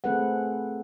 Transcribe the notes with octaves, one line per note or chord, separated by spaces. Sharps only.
A3 C4 G#4 A4 B4 F#5